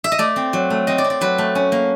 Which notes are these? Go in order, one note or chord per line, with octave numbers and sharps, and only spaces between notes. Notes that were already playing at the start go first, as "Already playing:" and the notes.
E5
D#5
A3 D5
C4
F#3
A3
C4 D#5
D5
C4
D5
F#3 B4
A3
C#4
A#3